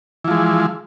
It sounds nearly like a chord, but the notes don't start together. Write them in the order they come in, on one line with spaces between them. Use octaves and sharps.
E3 F3 G#3